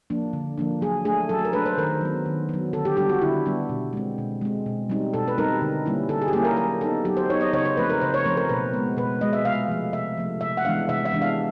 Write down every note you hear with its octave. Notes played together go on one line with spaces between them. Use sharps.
F3 A#3 D4
D3
F3 A#3 D4
F#3 G#4
A3 D4 G#4
F#3 A4
A#4
A3 D4 B4
C5
D#3 A#4
F#3 B3
D#3
F#3 B3
D3 A4
G4
G3 B3 D4 G4
F#4
D3 E4
G3 B3 D4
B2
G#3 C4
B2
G#3 C4
B2
G3 C4 D#4
B2 A4
B4
G3 C4 D#4 A#4
D3
G3 A#3 C#4 E4
D3 A4
G#4
G4
G3 A#3 C#4 E4 G#4
A#4
F#3 A#4
B3 D#4 A4
F#3 G4
C5
B3 D#4 C#5
D#5
C#3 C#5
C5
F3 A3 C4 B4
A#4
C#3 C5
C#5
F3 A3 C4 C5
A#4
B2 B4
G#3 B3
B2 B4
G#3 B3 D#5
E5
C3 F5
F3 A3
C3 E5
F3 A3
C3 E5
F#5
E3 G#3 B3 D4 F5
C3 E5
E5
E3 G#3 B3 D4
F5